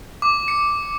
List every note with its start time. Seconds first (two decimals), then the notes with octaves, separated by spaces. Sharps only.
0.22 D6
0.48 C#7